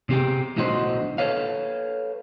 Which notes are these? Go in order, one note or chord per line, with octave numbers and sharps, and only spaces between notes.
C3 C4 G4 G#4 G5
B1 A2 D3 D#4 F#4 C5
A4 B4 C#5 F5